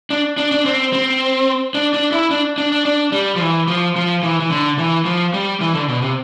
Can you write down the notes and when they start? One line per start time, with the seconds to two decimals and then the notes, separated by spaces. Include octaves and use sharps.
0.10 D4
0.38 D4
0.52 D4
0.66 C4
0.93 C4
1.74 D4
1.94 D4
2.12 E4
2.31 D4
2.58 D4
2.72 D4
2.85 D4
3.12 G3
3.36 F3
3.41 E3
3.68 F3
3.96 F3
4.23 E3
4.40 E3
4.50 D3
4.78 E3
5.05 F3
5.34 G3
5.61 E3
5.74 D3
5.88 B2
6.02 C3